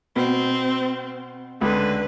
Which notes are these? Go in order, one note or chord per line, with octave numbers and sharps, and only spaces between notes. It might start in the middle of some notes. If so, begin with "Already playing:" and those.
B2 C4
C#2 D3 B4